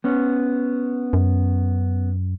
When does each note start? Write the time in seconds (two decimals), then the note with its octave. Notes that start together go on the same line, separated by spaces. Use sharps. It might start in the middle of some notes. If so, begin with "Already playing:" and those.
0.04 B3 C#4
1.13 F#2